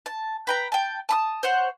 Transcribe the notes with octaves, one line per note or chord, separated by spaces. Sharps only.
A5
B4 G5 A#5
G5 A5
A5 B5 D#6
C5 C#5 F#5